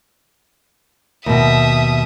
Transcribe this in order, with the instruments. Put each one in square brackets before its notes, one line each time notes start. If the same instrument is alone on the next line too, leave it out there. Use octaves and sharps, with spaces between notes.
[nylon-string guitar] D#2 B2 [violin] E5 D#6